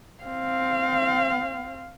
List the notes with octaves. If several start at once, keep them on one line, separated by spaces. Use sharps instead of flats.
C4 F5